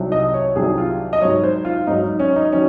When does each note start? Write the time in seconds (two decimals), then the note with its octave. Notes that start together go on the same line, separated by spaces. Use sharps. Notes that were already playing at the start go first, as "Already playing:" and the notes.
Already playing: C2 C3 D#3 F#3
0.12 D#5
0.34 C#5
0.56 C2 C3 D#3 F#3 G#4
0.78 F4
1.13 D#5
1.22 G#2 F#3 C#5
1.44 C5
1.65 F4
1.87 G#2 F#3 D#4
2.03 D#4
2.20 C#4
2.36 D#4
2.52 D#3 F#3 C#4